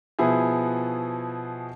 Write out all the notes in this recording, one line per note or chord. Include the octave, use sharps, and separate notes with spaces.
B2 F3 B3 E4 G#4